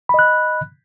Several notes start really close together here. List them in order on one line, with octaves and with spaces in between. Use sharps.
B5 D#5 F#6